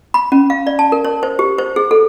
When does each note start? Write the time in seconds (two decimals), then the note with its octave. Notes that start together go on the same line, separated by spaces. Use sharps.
0.14 B5
0.32 C#4
0.50 F5
0.67 D5
0.79 A5
0.92 A#4
1.05 C#5
1.23 C5
1.39 G4
1.58 C5
1.76 G#4
1.91 A4